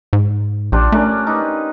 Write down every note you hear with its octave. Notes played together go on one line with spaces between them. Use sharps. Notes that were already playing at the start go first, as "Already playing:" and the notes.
G#2
A#1 D4 F4 G4
A3 C#4 D4 A#4
D#4 B4